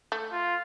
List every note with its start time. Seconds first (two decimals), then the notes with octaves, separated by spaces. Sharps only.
0.12 A3
0.32 F4